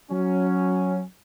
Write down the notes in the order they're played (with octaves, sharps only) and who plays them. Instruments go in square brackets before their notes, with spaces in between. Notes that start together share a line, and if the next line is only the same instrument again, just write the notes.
[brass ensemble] F#3 C#4